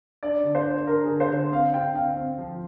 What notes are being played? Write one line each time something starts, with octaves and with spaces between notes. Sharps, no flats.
D4 D5
D3
C5
D4
D4 A#4
G#4
D3
C5
D3
C4 F5
D3 G5
C4 F5
C4
F3